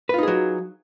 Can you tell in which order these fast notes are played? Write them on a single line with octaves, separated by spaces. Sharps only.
B4 F4 D#4 G#4 F#3